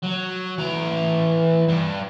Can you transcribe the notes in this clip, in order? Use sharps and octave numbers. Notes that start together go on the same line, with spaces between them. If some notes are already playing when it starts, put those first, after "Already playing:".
F#3
E3 A#5
G2